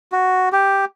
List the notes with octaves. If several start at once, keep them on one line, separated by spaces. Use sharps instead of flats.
F#4
G4